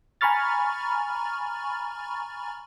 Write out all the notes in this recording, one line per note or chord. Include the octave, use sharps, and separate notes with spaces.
G#5 A#5 B5 C#6 F6 A6